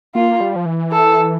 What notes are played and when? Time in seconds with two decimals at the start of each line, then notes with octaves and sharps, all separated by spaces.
0.15 A#3 F4
0.41 G3
0.56 F3
0.66 E3
0.92 A4